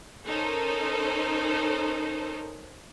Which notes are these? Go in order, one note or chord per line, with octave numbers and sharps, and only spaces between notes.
C#4 D#4 A4 A#4 C5